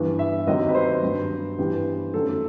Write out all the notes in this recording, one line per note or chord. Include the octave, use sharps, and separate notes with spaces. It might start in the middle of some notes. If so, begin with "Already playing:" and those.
Already playing: G2 E3 B3
E5
D#2 D#3 F#3 C4 D#5
B4
C5
G2 F#3 B3
G2 E3 G3 B3
F#2 D#3 F#3 A3 A4